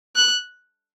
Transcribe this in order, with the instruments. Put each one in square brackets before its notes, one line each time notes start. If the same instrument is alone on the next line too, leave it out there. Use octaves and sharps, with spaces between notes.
[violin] F#6